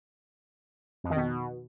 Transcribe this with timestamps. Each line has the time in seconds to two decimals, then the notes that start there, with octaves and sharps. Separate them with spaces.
1.04 F2
1.10 D#3
1.16 B2